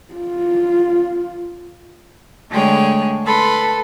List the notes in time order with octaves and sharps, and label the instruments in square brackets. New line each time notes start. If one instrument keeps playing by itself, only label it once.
[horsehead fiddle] F4
[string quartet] D3 G#3 A3 G#4 C#5 G5
A4 B4 B5 C6